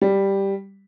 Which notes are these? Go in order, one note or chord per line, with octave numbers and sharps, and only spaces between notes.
G3